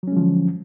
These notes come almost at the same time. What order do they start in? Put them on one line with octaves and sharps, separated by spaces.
F#3 C#4 G#3 F3 D3